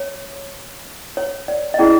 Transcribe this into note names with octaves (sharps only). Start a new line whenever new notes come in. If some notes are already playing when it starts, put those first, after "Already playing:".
Already playing: C#5
C#5
D5
D#5
C#4 E4 G#4 D5